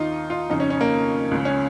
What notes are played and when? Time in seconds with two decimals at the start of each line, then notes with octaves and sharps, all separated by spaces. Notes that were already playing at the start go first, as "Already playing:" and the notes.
Already playing: D#2 D#3 D#4 F4
0.30 F4
0.50 F2 C#3 D#4
0.60 C#4
0.70 C#4
0.81 A#3
1.31 C#2 C#3
1.45 C#4